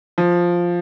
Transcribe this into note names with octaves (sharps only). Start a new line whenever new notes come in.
F3